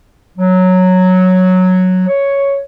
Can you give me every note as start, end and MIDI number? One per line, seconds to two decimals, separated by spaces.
0.38 2.05 54
2.08 2.61 73